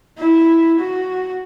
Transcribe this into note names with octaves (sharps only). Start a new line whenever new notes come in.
E4
F#4